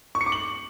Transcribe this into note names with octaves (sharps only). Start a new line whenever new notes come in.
C#6
C#7
D6
F#7